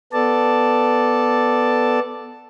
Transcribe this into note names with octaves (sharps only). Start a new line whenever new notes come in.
B3 A4 D5 A5